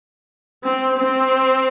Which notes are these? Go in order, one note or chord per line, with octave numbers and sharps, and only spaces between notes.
C4
C4